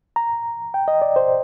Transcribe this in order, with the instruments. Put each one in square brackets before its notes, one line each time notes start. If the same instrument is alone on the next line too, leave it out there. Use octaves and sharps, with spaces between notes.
[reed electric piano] A#5
G5
D#5
D5
C5